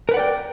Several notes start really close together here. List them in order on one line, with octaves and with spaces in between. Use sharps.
A#4 B4 F#5 D5 G5